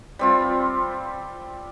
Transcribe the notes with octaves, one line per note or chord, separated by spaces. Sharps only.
G3 C4 F4